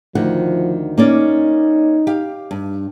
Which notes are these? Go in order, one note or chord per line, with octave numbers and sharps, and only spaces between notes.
D2 D#3 F3 F#5
A#3 C#4 D#4 D5
G4 F5
G2